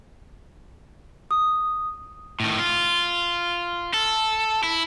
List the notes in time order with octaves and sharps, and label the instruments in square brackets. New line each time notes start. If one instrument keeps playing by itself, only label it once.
[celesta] D#6
[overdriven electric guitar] A2 D#3
F4
A4
E4